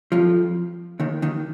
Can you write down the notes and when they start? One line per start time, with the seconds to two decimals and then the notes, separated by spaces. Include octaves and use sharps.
0.12 F2 F3
1.00 D#2 D#3
1.22 D#2 D#3